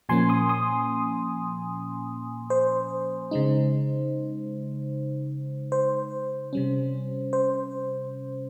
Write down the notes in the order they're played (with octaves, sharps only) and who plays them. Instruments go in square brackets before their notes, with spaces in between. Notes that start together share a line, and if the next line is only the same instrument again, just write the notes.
[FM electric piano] A#2 F3 A#3 C#4 G#5 C6
C6 D#6
C6 D#6
C5
C#3 G#3 D#4
C5
C3 G3 C#4
C5